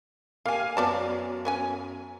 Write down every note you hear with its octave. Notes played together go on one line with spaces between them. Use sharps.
A#3 G4 F5 G#5
F#2 B3 D5 A5
B3 C#4 G#5